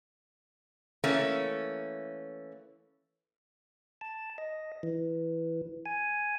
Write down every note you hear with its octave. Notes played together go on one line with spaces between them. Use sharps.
E3 A3 A#3 C#4
A5
D#5
E3
G#5